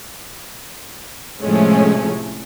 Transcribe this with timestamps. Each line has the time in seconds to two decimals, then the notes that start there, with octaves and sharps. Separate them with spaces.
1.42 A2 C3 F3 G#3 A3 C#4